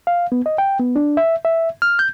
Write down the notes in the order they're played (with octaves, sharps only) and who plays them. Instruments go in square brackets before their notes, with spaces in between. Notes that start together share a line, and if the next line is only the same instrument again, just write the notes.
[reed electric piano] F5
B3
D#5
G5
B3
D4
E5
E5
F6
G6